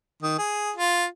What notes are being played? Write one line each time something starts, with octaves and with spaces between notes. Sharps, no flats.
D#3
G#4
F4